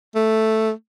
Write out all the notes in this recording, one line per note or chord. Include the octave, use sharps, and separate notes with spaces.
A3